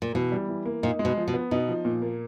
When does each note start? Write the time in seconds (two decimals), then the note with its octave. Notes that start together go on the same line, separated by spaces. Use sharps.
0.02 A#2
0.14 B2 E3
0.32 G3
0.49 E3
0.66 A#3
0.83 A#2 D#4
0.99 G#3
1.05 B2
1.17 F3
1.28 B2
1.34 B3
1.51 B2 D#4
1.68 F3
1.85 A#2
2.02 A#3